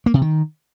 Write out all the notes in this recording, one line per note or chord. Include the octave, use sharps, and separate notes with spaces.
A#3
C3
D#3